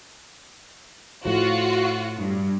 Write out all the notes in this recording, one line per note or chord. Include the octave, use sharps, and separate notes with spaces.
A2 F3 F4 F#4
G2